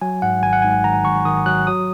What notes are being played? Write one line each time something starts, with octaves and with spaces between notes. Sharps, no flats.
F#3 G#5
G#2 F#5
G#1 G#5
F#5
G#2 G#5
D#3 A#5
G#1 C#6
D#3 D#6
F#3 F#6
F#3 D#6